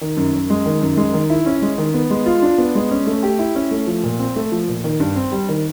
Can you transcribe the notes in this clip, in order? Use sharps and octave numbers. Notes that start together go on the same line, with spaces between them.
D#3
F#2
F#2
G#3
D#3
F#2
G#3
D#3
E4
C#4
G#3
D#3
B3
G#3
F4
D4
B3
G#3
C#4
A3
G4
E4
C#4
A3
F3
A#2
C4
A3
F3
A#2
D#3
G2
C4
G3
D#3